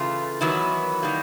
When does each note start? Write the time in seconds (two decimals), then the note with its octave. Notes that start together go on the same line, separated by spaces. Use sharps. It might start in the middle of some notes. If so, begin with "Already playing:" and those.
Already playing: C#3 E3 A3 F4
0.41 D#3 E3 F#3 B3 E4
1.03 D#3 G3 A#3